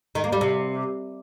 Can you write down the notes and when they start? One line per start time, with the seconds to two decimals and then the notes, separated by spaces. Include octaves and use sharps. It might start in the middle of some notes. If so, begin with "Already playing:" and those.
0.15 D#3
0.24 A#3
0.32 G3
0.41 C3